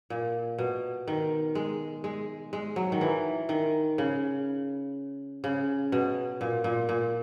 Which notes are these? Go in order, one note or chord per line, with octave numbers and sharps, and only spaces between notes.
A#2
B2
D#3
G#3
G#3
G#3
F#3
D#3
E3
D#3
C#3
C#3
B2
A#2
A#2
A#2